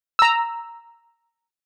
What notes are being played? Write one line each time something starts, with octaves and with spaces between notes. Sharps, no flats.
A#5 E6